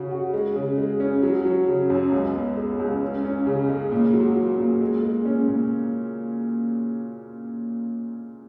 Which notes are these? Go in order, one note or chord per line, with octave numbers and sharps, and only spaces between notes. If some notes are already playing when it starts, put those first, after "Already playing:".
Already playing: C#3 F#4
F#4
G#3
C#3
G#3
C#4
F#3
F#3
C#3
F#2
C#2
B3
G#3
C#2
C#4
C#4
C#3
G#3
A#2
F#3
F#3
A#2
G#3
G#3
C#4
A#2